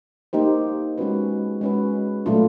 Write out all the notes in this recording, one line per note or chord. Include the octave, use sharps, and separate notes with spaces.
A#3 D#4 G4 C5
G#3 C#4 F#4 B4
G#3 C#4 F#4 B4
A#2 F#3 A3 D4 F4